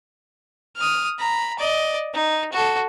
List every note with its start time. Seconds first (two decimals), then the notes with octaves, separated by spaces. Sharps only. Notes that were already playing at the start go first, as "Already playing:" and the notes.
0.77 D#6 F6
1.19 A#5 B5
1.59 D5 D#5
2.14 D#4
2.52 F#4 A4